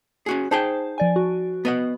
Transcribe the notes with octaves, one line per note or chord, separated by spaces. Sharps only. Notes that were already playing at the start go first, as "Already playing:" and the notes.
C#4 F#4 G#4
D#4 G#4 C5 G5 A5
F3 D5 G#5
F#4
B3 D#5 F#5